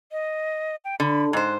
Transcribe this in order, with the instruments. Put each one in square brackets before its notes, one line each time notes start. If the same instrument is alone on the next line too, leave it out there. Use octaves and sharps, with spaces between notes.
[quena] D#5
G5
[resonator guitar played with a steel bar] D3 [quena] B5
[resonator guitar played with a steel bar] G#2 C5 [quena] F#6